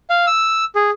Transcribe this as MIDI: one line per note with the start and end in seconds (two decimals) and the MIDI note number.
0.10 0.26 77
0.27 0.65 88
0.75 0.91 68